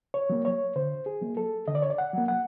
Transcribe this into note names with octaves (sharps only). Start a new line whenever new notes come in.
C#5
F#3 A#3
C#5
D3 C5
G#4
F#3 A#3
A4
D3 D#5
D5
C#5
D5
F#5
F#3 A#3
F#5